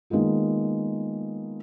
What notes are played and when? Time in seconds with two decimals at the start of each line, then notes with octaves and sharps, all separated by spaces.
0.10 D#3 G#3 A#3 B3 F4